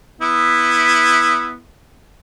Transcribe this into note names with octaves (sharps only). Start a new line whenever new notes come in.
B3 E4